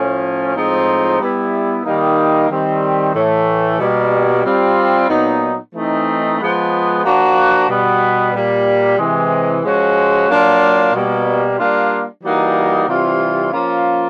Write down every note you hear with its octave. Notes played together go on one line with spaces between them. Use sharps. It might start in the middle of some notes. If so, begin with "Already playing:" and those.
Already playing: A2 F3 A3 C#4
A2 F3 G#3 C4 D#4
G3 B3 E4
D#3 G3 A#3 D#4
D#3 G3 C4
A2 E3 A3
B2 G3 A#3
G3 C4 F4
A#2 F#3 B3 D#4
E3 A3 C4 D#4
F3 G#3 B3
F3 A#3 D4 F#4
B2 G3 B3
A#2 G3 A#3
C3 E3 G#3
F3 G#3 C#4 F#4
F#3 A#3 D4 F4
B2 G3 A#3
G3 A#3 D4 F4
E3 G3 A#3 D#4 F#4
C3 E3 G3 C4 F4
F3 A#3 C#4 F4